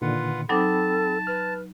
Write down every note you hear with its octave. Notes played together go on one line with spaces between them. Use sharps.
A#2 D3 D#3 F4 B4 F#5
F#3 C4 D#4 A4 G5 A5 B5 D6
B4 F6